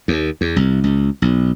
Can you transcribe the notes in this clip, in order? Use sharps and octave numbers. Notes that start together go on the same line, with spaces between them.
D#2
E2
C2
C#2
B1